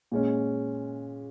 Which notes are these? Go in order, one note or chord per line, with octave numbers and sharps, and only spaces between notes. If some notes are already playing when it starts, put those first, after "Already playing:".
A#2 G#3 C#4